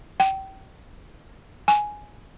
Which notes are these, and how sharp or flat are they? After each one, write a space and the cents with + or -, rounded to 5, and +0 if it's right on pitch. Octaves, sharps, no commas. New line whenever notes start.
G5 -25
G#5 +5